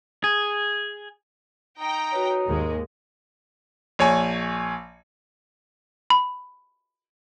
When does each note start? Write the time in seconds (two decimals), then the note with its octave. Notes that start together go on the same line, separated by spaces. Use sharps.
0.24 G#4
1.79 D#4 G5 A#5
2.12 F#4 B4 C#5
2.47 D#2 G#2 G#3 A#4
3.99 A#1 C#5 G#5
6.10 B5